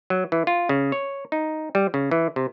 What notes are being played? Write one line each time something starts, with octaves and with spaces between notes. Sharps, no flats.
F#3
E3
F4
C#3
C#5
D#4
G3
C#3
E3
C3